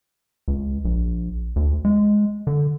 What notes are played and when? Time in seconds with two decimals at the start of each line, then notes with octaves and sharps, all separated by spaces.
0.48 C#2
0.85 A#1
1.56 D2
1.85 G#3
2.47 D3